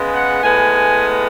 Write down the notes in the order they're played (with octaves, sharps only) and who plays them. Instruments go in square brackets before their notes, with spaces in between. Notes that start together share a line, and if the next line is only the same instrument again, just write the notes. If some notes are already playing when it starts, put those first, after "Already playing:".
Already playing: [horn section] C#3 G#3 B3
F#5
A2 G#3 B3 G#5